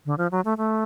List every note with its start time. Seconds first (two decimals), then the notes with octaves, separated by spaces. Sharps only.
0.06 D3
0.18 F3
0.32 F#3
0.45 A3
0.58 A3